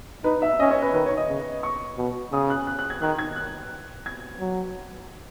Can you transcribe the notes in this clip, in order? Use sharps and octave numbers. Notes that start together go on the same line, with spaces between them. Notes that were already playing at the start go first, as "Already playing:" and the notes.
D#4 B4
E5
C#4 D#5
C#5
B4
D#3 B4
C#5
D#5
C#3
C#6
B2
C#3 D#6
F#6
F#6
F#6
G#6
D#3 F#6
G#6
F#6
G#6
F#3